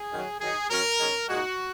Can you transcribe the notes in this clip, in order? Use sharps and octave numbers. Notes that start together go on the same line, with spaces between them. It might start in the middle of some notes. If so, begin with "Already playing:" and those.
Already playing: G#4
F#2 D#3 F#3
D#3 F#3 D#4 G#4
F#2 F#3 C#4 A#4
D#3 G#3 C#4
A#2 G#3 D#4 F#4